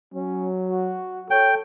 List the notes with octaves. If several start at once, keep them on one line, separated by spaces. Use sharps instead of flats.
F#3 C#4
F#4
A4 C#5 G5